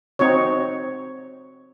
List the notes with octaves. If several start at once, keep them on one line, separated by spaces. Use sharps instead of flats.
C4 D#4 F#4 C#5